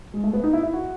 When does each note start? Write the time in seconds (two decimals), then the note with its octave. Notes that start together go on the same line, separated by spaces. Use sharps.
0.14 G#3
0.24 A3
0.33 B3
0.43 D#4
0.53 E4
0.63 E4
0.73 F#4